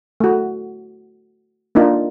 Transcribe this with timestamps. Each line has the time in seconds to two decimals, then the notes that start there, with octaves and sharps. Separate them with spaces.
0.20 A3 F#4
1.75 A#3 D4 D#4 F4